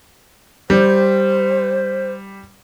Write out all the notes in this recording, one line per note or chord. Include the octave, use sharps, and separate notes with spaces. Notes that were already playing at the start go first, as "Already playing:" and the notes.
G3 C5